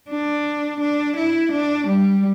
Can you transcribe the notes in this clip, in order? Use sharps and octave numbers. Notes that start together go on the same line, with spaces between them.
D4
D4
E4
D4
G3